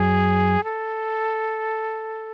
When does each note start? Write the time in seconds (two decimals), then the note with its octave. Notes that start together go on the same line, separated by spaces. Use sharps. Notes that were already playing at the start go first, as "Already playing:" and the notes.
Already playing: F#2 F#3 G#4
0.64 A4